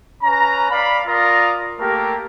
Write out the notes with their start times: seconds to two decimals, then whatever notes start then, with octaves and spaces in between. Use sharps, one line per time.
0.23 C#4 B4 A#5
0.70 D5 F5 B5
1.07 F4 A#4 D5 A#5 D#6
1.79 A3 A#3 G4 A#4